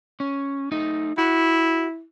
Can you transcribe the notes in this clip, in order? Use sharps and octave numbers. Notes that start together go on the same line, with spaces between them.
C#4
A3 D#4
E4 F#4